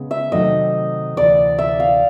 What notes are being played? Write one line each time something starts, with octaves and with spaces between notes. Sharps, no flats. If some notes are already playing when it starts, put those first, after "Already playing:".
Already playing: C#3 G#3 B3
E5
C3 D#3 F#3 A3 D#5
D2 C3 E3 D5
E5
F5